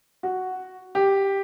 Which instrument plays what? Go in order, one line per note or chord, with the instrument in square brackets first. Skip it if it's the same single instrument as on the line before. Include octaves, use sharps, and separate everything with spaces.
[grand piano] F#4
G4